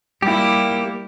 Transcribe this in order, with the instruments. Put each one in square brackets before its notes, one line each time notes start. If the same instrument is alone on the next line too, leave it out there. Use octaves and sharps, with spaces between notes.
[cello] G3 E4 [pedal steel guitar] A#3 G4